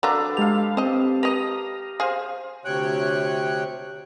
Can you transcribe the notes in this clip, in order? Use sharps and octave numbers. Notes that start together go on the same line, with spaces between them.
F#3 D4 F4 A4 B4 A#5 D6
G#3 G4 F5 F7
C4 C5 D#5
B4 D#5 A#5 D#6 F7
G#4 C5 F5
D2 C3 C#5 G5 F#6